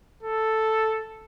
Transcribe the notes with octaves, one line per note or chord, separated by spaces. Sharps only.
A4